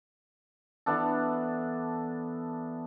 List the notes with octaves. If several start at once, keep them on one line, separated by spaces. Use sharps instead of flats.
E3 B3 D4 A4